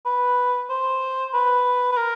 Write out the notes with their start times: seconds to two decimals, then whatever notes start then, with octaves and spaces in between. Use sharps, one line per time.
0.05 B4
0.70 C5
1.33 B4
1.92 B4
1.97 A#4